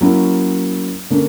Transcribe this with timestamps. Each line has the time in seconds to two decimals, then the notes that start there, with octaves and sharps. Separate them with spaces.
0.01 F#3 A#3 C#4 E4
1.10 D3 A#3 C#4